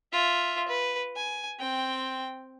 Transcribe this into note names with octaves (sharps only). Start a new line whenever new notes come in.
F4 E5
B4
G#5
C4 G5